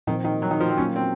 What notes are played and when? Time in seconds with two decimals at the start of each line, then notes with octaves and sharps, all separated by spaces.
0.07 A#2 D#3 F3 C4 D#4 A#4
0.25 D#3
0.42 F#3
0.51 D#3
0.61 F3
0.69 C4
0.78 F#3 A#3 C#4 F4
0.96 C4